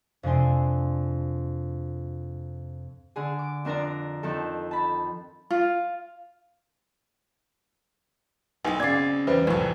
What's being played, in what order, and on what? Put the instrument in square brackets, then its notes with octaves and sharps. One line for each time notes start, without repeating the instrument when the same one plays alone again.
[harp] F2 C3 G#3 D4 G#5 C6
D3 G#4
D6
F2 D4 A#4 D5 A#5
F2 D#3 A4
A5 B5
[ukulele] F4
[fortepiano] B1 [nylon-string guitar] B3 E4 [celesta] G#5
[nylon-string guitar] C#3 C4 [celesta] D5 D6 A6 [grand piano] G#6 C7
[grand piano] E2 [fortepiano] G3 [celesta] B4 C5 E5
[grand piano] C2 F2 A2 [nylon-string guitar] E3 F#3